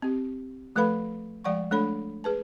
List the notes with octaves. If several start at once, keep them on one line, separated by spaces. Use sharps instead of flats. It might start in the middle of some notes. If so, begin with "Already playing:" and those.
C4 G4
F3 A3 A4 B4 F5 B5
F3 G#3 D5 F#5 G5 C#6
G#3 A3 D4 A4 C#5 B5
G#4 B4 A5